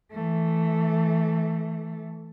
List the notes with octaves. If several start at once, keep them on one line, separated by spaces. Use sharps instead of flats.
E3 A3